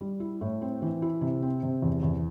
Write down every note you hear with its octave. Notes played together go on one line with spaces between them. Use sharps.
G3
E4
A2
C4
E3
E4
C3
C4
C3
E2
E2